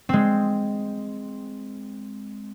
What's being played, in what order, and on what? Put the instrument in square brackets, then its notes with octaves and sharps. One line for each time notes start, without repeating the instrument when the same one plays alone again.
[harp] G#3 C4